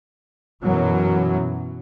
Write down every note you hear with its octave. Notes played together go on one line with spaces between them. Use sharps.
F#2 B2 E3 F#3